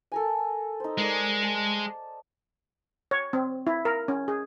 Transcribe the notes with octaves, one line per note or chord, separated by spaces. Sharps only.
A4 A#4 G#5
D#4 C5
G#3 A#4 D5
A5
C#5
C4
E4
A#4
C#4
G#4